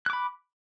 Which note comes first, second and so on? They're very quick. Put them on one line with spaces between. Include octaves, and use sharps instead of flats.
F#6 D6 B5